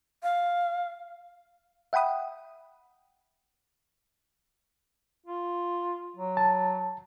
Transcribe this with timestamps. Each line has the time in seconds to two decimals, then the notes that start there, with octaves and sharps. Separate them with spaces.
0.23 F5
1.93 E5 F#5 G5 B5 D#6
5.27 F4
6.16 F#3
6.37 A5